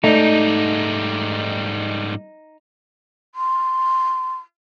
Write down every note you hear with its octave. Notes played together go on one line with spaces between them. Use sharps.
G#2 G3 A3 D#4 D5
C6